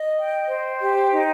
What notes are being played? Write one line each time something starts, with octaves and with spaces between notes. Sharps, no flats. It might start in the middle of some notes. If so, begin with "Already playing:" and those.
Already playing: D#5
G5
C5
G4
D#4